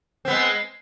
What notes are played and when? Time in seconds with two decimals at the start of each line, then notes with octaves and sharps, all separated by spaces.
0.25 C4
0.28 B3
0.31 G#3